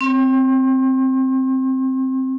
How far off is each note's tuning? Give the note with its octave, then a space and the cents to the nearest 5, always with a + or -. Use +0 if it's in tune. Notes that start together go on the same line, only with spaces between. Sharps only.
C4 +0 C6 +45